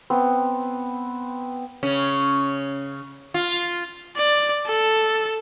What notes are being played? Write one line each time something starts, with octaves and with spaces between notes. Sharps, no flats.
B3 C4
C#3 C#4
F4
D5
A4